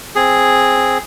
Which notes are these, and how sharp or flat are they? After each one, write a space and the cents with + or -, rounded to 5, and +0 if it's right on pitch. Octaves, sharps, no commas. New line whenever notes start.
C4 +0 G#4 +0